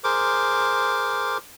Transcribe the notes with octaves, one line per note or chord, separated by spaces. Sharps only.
G#4 A#4 C5 D6